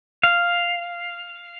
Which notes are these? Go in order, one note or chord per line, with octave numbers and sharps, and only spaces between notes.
F5